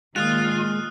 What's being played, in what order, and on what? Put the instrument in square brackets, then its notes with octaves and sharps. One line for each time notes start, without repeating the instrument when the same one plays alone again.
[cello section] A#2 D#3 [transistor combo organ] G#3 [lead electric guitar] F4 [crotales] D#6 F6 F#6